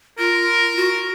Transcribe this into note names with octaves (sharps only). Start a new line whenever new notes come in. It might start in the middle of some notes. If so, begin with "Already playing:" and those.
F4 A#4
F#4